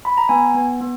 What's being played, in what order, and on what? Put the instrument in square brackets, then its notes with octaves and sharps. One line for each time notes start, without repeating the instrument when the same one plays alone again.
[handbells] B5
A#5
B3 G#5
B3
B3